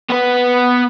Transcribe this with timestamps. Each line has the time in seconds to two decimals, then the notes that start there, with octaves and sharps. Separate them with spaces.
0.10 B3 B4